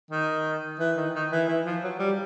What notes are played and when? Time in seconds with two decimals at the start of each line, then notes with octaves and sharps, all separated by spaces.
0.11 D#3
0.80 E3
0.97 D#3
1.14 D#3
1.31 E3
1.48 E3
1.66 F3
1.83 F#3
2.00 G3